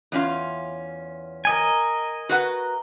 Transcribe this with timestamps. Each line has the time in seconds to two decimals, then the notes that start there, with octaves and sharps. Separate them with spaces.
0.12 E2 C#4 F4
1.45 A#4 D#5 G#5
2.29 F#4 B4 F#5